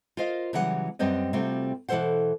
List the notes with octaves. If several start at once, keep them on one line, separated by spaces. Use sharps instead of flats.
F4 A#4 C5 D#5 F5
C#3 E3 F#3 G3 B3 F#5
F#2 G3 B3 C4 D#5
C3 G3 A3 C4 F4 F#4
B2 E3 A#3 A4 C5 F#5